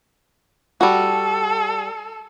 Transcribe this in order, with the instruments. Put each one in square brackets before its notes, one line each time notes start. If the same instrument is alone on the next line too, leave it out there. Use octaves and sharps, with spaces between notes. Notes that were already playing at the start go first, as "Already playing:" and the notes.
[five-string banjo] G3 F#4 [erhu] A4